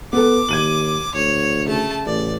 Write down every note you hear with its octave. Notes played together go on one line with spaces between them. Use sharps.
B3 A4 D6
D#2 G#6 D#7 F#7
D2 C#5
C#3 A3 A5
A1 D5